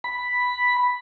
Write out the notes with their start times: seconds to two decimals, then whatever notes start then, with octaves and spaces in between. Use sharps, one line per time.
0.04 B5